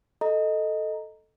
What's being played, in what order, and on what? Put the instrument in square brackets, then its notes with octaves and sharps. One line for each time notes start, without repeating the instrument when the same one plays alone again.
[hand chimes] A4 D#5 A#5